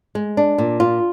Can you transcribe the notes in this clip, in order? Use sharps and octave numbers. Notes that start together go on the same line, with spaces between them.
G#3
D4
A#2
F4